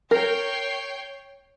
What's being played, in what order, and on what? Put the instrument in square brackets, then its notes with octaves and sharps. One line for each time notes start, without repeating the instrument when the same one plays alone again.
[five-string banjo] A#4 [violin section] C#5 G5 C7